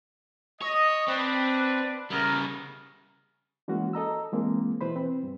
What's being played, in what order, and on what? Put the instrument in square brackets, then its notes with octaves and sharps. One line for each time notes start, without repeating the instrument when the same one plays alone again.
[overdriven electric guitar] C#5 [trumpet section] D#5
[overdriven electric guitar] C4 [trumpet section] D4 B4
[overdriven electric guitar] C#3 G3 [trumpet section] B3 E4 A#4
[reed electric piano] E3 G#3 A#3 C#4 F#4
A4 D#5 A#5 E6
E3 G#3 A#3 C4
B2 E3 B4 C5 B5
C4
G2